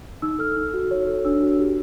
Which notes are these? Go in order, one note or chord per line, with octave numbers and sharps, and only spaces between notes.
D#4 E6
A4 F6
D#4
F#4
C#5
A4
D4 E6
F#4
G4